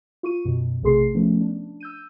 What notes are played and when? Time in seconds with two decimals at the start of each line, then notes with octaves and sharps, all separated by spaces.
0.23 F4 C#6 D#7
0.45 F#2 B2
0.82 A#1 C3 A3 G#4 C6 C7
1.15 F3 A3 B3 C#4
1.41 D4
1.81 E6 G6 D#7